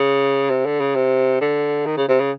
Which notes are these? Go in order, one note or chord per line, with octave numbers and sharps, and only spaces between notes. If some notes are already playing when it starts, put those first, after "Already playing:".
Already playing: C#3
C3
D3
C#3
C3
D3
D#3
C#3
C3
C#3